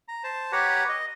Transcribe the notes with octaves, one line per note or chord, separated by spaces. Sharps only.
A#5
C5 A5
G4 B4 C#5 F#5 A#5
D#5